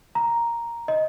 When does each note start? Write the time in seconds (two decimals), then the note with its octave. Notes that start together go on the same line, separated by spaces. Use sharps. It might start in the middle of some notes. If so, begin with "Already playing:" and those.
0.15 A#5
0.88 D#5